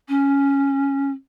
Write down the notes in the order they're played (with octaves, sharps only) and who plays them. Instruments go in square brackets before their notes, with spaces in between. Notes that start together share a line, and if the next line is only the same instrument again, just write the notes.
[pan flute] C#4